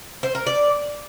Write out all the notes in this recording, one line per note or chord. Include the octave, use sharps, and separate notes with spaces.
C5
A#4
D5